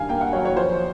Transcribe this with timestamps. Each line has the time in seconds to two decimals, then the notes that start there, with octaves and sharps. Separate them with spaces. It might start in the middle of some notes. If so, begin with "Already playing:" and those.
Already playing: G2 D#3 F5 G#5
0.09 A#3 G5
0.21 F#5
0.33 F#3 C#5
0.45 C#5
0.56 F3 C5